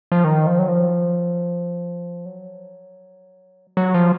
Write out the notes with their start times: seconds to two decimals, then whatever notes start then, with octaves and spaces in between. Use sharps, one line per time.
0.12 F3
0.24 D#3
0.47 F3
0.59 F#3
0.68 F3
2.25 F#3
3.77 F#3
3.94 F3